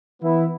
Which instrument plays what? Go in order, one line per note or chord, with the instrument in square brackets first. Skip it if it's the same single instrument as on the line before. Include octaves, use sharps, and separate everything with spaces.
[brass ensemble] E3 B3 E4